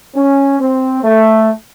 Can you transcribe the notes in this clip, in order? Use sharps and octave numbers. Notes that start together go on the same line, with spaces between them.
C#4
C4
A3